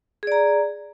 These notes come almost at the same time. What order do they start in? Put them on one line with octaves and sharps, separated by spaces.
G#4 D5 A#5